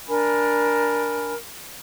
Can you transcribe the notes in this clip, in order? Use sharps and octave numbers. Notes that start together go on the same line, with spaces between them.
D4 A#4 G#5 B5